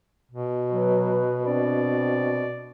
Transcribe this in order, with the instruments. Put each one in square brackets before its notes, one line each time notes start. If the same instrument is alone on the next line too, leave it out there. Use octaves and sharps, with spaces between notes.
[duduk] B2
[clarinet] F#3 [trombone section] B4
[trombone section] C4 D4 [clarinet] D5